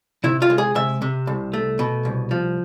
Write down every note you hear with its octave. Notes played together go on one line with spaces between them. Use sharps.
C3 E4
F4
G#3
G#4
C3 E5
C3
C2
A3
B2
C2
F3